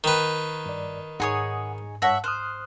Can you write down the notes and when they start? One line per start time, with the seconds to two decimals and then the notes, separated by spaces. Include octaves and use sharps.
0.04 D#3 B4 G5 A#5
0.66 G2 D5
1.20 G#2 D#4 G#4 C#5 F#5 G#5 D#6
2.02 G2 C#5 E5 F#5 A5 A#6
2.24 C5 D#6 F6 F#6